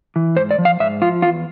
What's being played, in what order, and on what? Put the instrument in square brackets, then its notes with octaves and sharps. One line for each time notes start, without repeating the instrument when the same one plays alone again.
[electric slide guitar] E3
G#2 C5
D5
F3
F5
G#2 E5
F3 F4
E2 F4